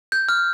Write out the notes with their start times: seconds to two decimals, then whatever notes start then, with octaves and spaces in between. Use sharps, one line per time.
0.12 G6
0.29 F6